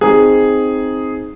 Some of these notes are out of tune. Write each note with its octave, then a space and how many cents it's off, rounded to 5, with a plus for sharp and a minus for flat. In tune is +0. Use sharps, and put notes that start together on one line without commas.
C4 +0 D#4 +0 G#4 +0